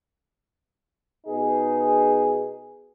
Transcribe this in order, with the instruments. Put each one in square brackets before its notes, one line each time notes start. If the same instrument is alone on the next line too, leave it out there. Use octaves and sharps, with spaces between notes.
[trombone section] B2 D#4 G#4